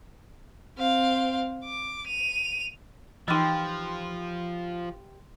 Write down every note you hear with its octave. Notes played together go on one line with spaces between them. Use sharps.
C4 F5
D6
D#7 F7
E3 F3 D#4 G4 B4 C6 F6 A6